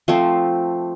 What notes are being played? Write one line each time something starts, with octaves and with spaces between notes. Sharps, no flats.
F3 A3 C4